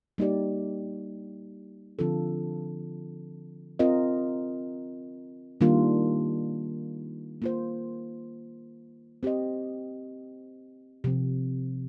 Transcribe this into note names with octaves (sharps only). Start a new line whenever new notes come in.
G3 A#3 D#4 G4 D5
D3 F3 C4 F4 A4
C4 F4 A#4 D#5
D#3 G3 A#3 D4 F4
A#3 F4 C5
C4 G4 C5 D#5
C3 F3 C4